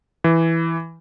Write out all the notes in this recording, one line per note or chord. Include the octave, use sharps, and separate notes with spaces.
E3